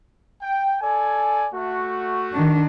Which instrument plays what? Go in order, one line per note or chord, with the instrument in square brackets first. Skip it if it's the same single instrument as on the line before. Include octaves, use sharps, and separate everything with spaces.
[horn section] G5
A4 D5 G#5
A3 F#4
[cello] D#3 D4